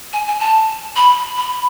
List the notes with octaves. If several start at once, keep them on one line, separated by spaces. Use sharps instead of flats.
G#5
G#5
A5
B5
B5